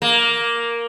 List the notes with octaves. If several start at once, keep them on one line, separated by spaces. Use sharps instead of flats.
A#3